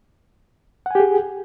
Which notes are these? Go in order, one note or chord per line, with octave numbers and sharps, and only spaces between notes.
G4 G#4 F#5 G#5